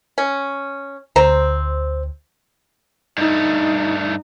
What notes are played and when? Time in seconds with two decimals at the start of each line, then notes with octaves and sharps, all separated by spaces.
0.18 C#4
1.16 D2 C4 C5 A#5
3.18 G2 A3 D#4